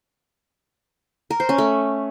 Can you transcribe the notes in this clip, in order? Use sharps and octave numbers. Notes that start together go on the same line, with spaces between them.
A#4
C5
C#4
A3